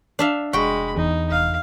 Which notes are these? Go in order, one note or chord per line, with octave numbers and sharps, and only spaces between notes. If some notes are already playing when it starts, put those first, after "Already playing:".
D4 E5 F5
F1 G#3 F#4 G5 B5
E2 D#4
F1 F5